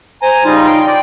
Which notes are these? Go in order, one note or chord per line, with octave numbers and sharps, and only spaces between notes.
C5 G#5 A#5
C#3 G3 D#4 F4
G5 C6
D5 G5